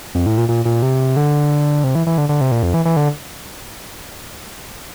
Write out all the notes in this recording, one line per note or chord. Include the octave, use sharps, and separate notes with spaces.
F2
A2
A#2
A#2
A#2
C3
D3
C3
E3
E3
D3
D3
C3
A#2
F2
E3
E3
D3